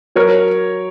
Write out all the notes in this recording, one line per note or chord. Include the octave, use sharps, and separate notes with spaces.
F#3 A#4 C#5